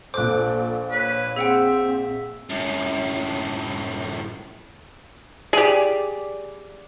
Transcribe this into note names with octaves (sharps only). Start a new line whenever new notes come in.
A#1 A4 C5 D6 F#6
B4 C#5
C4 G#4 E5 F#5 G5
F#2 A2
G4 G#4 D5